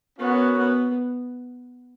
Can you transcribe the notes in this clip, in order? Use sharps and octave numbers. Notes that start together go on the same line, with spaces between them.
B3 C#4 F#4 A#4 C#5 F#5
B3